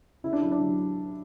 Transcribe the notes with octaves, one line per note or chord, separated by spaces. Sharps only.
C#3 E4
D4
F#3 E4
D4
F#3